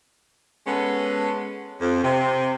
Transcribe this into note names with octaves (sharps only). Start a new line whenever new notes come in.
G#3 B3 C#4 A4 B4
F2
C3